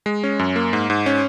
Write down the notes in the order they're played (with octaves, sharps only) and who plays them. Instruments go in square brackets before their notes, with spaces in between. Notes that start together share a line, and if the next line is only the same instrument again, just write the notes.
[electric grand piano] G#3
C#4
F#2
A#3
G#2
G#2
C#4